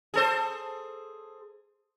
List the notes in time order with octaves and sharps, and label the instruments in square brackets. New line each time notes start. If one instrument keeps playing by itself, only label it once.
[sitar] G#4 A4 C5